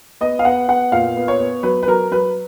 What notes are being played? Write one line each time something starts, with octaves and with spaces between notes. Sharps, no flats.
B3 D#5
F5
B3 F#5
B3 F#5
A#2 F5
B3
C#5
B3
F#3 B4
B4
F#3 A#4
F#3 B4